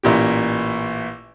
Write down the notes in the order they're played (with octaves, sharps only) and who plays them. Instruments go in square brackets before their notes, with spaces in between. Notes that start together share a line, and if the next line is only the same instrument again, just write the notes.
[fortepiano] A1 A#2 G4